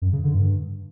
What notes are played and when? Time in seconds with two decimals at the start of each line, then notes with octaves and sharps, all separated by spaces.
0.02 F#2
0.13 C#3
0.24 D3
0.34 G2